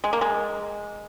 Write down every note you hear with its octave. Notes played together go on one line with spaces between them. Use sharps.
G#3
A#3
G#3